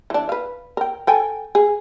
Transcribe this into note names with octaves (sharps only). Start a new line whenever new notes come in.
E3 D4
B4 F5
A#4 G5
A4 G5 G#5
G#4